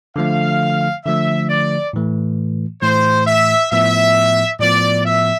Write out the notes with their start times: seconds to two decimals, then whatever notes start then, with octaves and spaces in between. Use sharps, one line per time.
0.16 D3 F3 A3 F5
1.05 D3 F3 A3 E5
1.49 D5
1.93 A2 E3 A3
2.82 A2 E3 A3 C5
3.27 E5
3.71 A2 F3 B3 E5
4.59 A2 F3 B3 D5
5.04 E5